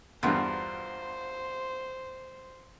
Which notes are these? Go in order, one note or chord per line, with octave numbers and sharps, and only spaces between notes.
E2 G2 F4 F#4 A#4 C5